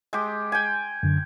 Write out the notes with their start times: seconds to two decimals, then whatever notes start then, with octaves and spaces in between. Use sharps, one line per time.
0.13 G#3 G4
0.52 G5 G#5
1.03 F#2 D3